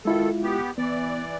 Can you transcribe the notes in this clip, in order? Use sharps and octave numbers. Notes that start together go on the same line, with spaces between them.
D#3 G#3 E4 F4 A4
B3 G4
E3 B3 D5